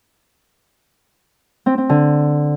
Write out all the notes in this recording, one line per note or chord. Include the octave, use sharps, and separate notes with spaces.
C4
C4
D3